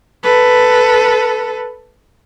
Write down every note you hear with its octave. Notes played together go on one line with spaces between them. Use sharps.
A4 B4